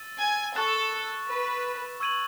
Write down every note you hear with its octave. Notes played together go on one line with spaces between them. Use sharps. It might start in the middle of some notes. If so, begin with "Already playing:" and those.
Already playing: E6 A6 D#7
G#5
A4 C#6 F#6 A6 E7
B4
C#6 E6 G#6 D#7 F#7